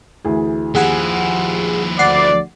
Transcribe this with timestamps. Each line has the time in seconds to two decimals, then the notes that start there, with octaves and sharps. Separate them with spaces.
0.25 D2 E3 G#4
0.75 D#2 F3 E4 G#4 F#5 G#5
1.99 D2 D5 F#5 C7